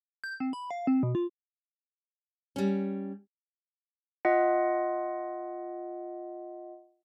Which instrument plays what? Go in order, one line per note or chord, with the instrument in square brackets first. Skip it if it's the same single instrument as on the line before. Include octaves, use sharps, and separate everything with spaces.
[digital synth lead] G6
C4
B5
F5
C4
B2
F4
[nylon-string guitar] G3 C#4
[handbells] F4 D#5 F#5